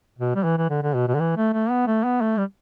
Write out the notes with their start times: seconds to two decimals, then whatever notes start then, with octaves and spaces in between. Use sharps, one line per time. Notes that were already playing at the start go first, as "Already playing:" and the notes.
0.18 B2
0.35 G3
0.44 E3
0.58 E3
0.70 D3
0.83 D3
0.95 B2
1.08 B2
1.14 D3
1.20 E3
1.37 A3
1.53 A3
1.70 B3
1.87 A3
2.04 B3
2.21 A3
2.37 G3